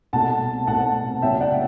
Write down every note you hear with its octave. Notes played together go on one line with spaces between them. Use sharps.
C2 B2 A3 F#5 A5
C2 B2 A3 F#5 A5
F#1 F#2 F#3 B3 E5 G5
D5 F#5